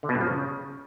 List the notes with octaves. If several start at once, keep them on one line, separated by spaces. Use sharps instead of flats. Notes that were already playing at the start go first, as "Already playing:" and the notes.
D3
B2
G2
F3
C#3